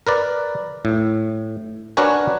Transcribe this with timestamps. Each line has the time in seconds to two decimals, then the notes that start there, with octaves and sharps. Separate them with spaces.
0.07 A#4 B4 D5
0.85 A2
1.97 D4 F#4 A#4 B4 C#5 G#5